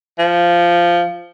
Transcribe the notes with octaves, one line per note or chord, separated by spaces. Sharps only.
F3